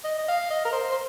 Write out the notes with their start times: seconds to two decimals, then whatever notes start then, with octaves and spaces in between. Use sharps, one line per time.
0.04 D#5
0.18 D#5
0.28 F5
0.50 D#5
0.65 A#4
0.73 C5
0.92 C5